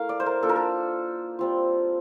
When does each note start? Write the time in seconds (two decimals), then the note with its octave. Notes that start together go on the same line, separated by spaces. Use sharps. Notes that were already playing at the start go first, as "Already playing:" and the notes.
Already playing: A3 E4 A#4 F5
0.09 D5
0.20 C5
0.26 A#4
0.42 A#3 D4 F4 A4
0.49 A#4
0.56 A4
1.39 G3 C4 F4